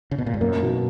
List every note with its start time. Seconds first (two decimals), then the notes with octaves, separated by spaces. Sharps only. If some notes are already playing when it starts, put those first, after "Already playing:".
0.11 C#3
0.18 B2
0.26 A#2
0.34 G#2
0.41 F#2 A#3
0.62 B2